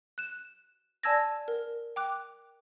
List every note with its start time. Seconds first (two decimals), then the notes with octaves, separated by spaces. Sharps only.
0.18 F#6 E7
1.03 D5 G#5 A5 E6 G#6 A#6
1.48 A#4
1.96 G5 D6 F#6